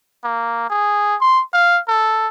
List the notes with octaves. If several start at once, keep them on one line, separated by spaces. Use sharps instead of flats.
A#3
G#4
C6
F5
A4